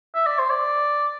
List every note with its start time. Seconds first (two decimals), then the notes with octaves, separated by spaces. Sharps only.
0.15 E5
0.26 D5
0.39 C5
0.50 D5